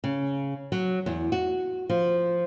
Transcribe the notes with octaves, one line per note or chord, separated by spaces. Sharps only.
C#3
F#3
E2
F#4
F3